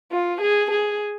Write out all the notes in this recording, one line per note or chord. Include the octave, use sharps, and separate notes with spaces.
F4
G#4
G#4